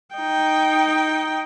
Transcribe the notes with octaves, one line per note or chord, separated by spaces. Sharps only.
D#4 G5